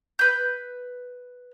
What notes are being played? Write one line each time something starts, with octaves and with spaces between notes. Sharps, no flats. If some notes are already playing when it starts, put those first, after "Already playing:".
B4 G6